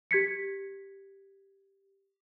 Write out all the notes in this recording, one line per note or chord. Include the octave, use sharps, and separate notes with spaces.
G4 G#6 B6 C#7